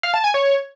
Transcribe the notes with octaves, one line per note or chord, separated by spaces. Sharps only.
F5
A5
G#5
C#5